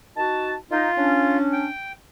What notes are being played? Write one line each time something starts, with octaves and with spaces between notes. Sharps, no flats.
D#4 F#4 A5
D#4 F4
C#4 D4
G5